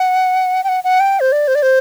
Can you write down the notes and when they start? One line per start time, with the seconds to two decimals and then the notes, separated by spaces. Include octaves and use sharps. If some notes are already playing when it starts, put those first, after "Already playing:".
Already playing: F#5
0.64 G5
0.69 F#5
0.84 F#5
1.00 G5
1.20 C5
1.32 D5
1.48 C5
1.55 D5
1.62 C5